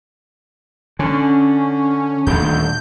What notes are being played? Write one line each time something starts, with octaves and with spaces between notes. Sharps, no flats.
D3 C#4
D#1 D2 D3 G6